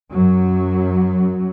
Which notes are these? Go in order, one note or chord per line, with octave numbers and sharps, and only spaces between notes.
F#2 F#3